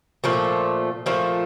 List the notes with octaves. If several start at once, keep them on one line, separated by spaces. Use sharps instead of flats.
A#2 F3 A3
A#2 F3 A3